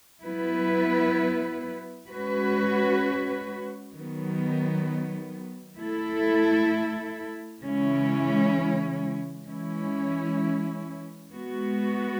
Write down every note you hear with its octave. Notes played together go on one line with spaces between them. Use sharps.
F#3 B3 E4 B4
G#3 C#4 F#4 B4
D#3 F#3 B3
A3 E4 A4
C#3 E3 G#3 C#4 E4
E3 G#3 C#4 E4
G#3 B3 F#4